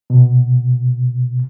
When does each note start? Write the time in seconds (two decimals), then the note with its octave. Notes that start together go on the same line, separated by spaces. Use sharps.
0.10 B2